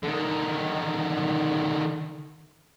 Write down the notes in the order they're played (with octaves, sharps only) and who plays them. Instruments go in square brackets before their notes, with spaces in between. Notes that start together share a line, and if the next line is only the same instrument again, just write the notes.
[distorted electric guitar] D3 D#3